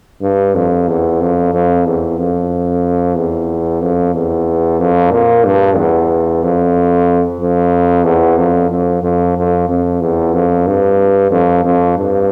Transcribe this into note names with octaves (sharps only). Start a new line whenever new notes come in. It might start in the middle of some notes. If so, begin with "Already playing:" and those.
G2
F2
E2
F2
F2
E2
F2
E2
F2
E2
F2
A#2
G2
E2
F2
F2
E2
F2
F2
F2
F2
F2
E2
F2
G2
F2
F2
G2